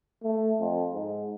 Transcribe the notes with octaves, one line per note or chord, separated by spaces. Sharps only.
A3
F2
G#2